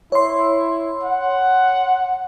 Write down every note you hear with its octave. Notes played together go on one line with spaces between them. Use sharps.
E4 C#5 C6
F#5